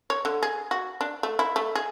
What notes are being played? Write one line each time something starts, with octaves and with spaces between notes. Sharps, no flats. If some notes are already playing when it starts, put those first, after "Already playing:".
C#5
D3
G#4
F#4
D4
A3
E4
A3
G#4